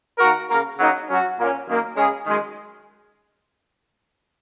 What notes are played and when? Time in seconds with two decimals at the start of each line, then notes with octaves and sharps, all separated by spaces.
0.19 D#3 A#3 F#4 A#4
0.48 C#3 A#3 F#4 A#4
0.78 C#3 F#3 A#3 D#4
1.08 F#3 C#4 F#4
1.38 A#2 A#3 C#4
1.67 F#2 D#3 A#3
1.97 C#3 G#3 C#4 G#4
2.26 F#2 D#3 G#3